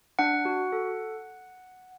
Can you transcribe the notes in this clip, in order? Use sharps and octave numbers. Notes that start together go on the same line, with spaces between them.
D4 F#5
F#4
A4